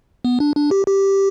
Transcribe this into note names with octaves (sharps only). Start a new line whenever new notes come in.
B3
D4
D4
G4
G4